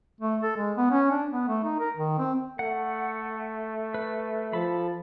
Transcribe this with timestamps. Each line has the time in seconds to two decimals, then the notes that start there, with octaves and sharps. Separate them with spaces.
0.21 A3
0.43 A4
0.57 G#3
0.77 B3
0.91 C#4
1.11 D4
1.31 B3
1.48 A3
1.64 D#4
1.80 A#4
1.97 D#3
2.19 C4
2.59 A3 F#5
3.94 B4
4.53 F3 A4 B5